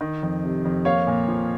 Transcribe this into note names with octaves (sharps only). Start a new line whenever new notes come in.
D#3
F2
C3
F2
A#3 C#5 F5
A#2
F3